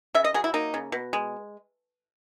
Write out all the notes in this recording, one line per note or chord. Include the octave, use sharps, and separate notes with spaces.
C#3 E5
D#5
F#3 G#4
E4
A#3 D#4
C#3
B2
G#3